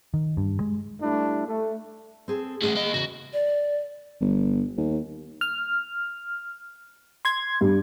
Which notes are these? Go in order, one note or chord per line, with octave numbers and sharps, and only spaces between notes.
D#3
G2
G#3
G3 A3 D4 E4
A3
C4 G#4 A4
A3 C#4 G#4 F5 F#5
A#3 D#5
E2 C#3 F#4
D5
G1
D#2
F6
C6 G#6
G2 G3